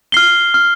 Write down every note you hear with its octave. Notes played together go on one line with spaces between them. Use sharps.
F6 C7 G7
F6